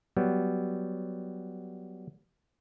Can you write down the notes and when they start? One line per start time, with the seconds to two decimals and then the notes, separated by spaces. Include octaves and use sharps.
0.17 F#3 G3 B3